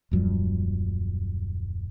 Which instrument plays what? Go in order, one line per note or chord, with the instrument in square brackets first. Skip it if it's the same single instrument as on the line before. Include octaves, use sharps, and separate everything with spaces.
[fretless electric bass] D#1 F#2 F3 G3